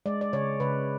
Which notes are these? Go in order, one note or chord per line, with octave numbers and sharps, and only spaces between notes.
G#3 D5
D5
C#3 C#5
C#3 B4